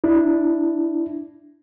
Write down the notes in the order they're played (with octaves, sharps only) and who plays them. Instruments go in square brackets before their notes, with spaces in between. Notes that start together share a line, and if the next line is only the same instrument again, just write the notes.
[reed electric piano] D4 E4